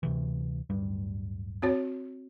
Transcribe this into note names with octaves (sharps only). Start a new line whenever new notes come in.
D2 C3 E3
D1 G2 G3
C4 F#4 C#5